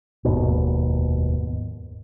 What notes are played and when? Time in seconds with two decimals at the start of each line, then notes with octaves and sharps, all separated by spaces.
0.25 F1 D#2 G#2 B2